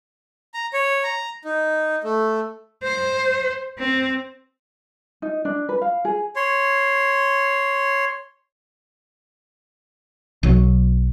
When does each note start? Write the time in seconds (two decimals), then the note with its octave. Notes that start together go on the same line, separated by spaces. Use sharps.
0.54 A#5
0.74 C#5
1.04 A#5
1.45 D#4
2.04 A3
2.83 C5
3.79 C4
5.22 D#4
5.45 D4
5.69 B4
5.82 F5
6.05 G#4
6.36 C#5 C6
10.43 B1 F#3